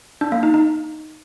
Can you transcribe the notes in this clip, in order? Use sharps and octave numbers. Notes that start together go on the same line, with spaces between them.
D4
A#3
D#4
D#4